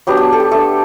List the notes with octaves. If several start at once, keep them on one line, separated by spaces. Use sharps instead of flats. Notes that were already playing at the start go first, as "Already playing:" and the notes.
F#3 B3 D4 G4
G4
A4
G4
A3 D4 A4